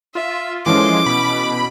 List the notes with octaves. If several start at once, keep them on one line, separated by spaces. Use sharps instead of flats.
F4 E5
E3 F3 G#3 C#4 A4 C6 D6
B2 B5 D7